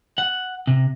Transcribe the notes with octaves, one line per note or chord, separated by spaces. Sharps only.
F#5
C3